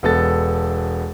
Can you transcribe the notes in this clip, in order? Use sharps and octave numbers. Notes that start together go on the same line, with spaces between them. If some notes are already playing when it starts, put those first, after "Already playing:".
E1 B3 A4 A6